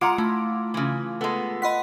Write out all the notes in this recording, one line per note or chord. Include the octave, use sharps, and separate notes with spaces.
G#3 F4 F#5 A#5 D6 D7
A3 E4
C#3 E3
G#3 B3 A4
B4 D#5 F#5 C6 B6